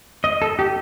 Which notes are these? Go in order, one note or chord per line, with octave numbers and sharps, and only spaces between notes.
D#5
A4
G4